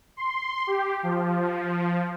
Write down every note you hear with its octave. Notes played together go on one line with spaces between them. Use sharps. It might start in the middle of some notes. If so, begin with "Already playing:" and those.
C6
G4
F3